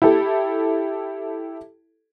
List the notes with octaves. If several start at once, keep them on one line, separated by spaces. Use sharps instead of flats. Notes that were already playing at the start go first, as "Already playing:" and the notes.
E4 G4 A4